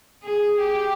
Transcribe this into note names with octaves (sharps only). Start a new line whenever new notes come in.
G#4
G4